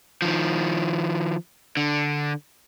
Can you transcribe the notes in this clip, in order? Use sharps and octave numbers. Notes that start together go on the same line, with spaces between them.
D#3 F3
D3